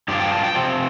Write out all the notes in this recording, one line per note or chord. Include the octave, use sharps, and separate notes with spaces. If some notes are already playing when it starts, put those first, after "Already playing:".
G2 F3 D4 F4 G4
G5
A5
G5
C3 F3 C4